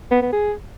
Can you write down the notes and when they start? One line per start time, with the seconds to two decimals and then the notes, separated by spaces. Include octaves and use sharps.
0.11 B3
0.22 B3
0.33 G#4